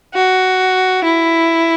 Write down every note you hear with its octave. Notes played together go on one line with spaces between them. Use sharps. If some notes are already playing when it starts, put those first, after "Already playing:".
F#4
E4